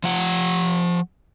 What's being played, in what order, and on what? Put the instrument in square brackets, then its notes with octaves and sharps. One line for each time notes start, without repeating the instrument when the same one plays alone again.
[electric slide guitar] F3 F#5